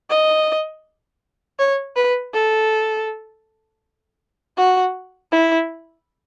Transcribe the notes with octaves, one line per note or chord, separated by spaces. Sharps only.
D#5
C#5
B4
A4
F#4
E4